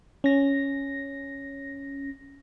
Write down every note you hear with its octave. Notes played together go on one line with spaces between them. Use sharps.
C#4 A#6